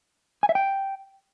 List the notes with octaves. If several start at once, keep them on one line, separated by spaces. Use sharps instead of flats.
G#5
E5
G5